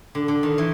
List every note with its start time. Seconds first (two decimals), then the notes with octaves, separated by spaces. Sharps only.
0.15 D3
0.28 D3
0.43 D#3
0.58 E3